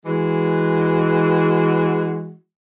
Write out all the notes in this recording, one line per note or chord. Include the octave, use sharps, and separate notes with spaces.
E3 G#3 F#4